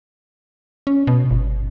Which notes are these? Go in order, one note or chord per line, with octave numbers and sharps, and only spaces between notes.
C#4
B2
G1